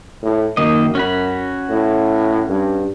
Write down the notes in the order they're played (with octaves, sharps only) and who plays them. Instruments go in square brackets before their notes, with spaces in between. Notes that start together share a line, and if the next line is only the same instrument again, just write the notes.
[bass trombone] A2
[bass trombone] F#2 [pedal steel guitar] D#3 A#3 D#5
[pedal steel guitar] C#4 F#4 B5
[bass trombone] A2
G2